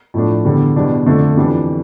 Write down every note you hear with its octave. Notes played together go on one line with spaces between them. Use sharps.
A2 F3 A3 D4
E2 D3 G3
E2 B2 G3 D4
F2 D3 A3 D4
F2 E3 G3 D4